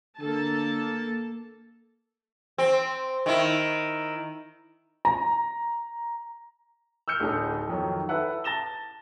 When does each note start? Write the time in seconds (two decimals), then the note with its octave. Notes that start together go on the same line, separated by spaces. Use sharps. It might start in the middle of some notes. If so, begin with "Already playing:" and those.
0.19 D3 A#3 A4 A5
2.58 C4
3.26 D#3 E4
5.05 A#5
7.08 E6 F6 G6 C#7
7.20 D1 D3 D#4 A4
7.67 F2 D#3 F#3
8.09 E4 A4 B4 F#5
8.44 A5 A6 A#6 E7 G7